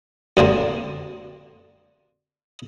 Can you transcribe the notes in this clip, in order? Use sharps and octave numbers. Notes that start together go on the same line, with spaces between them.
F#2 D3 A#3 C4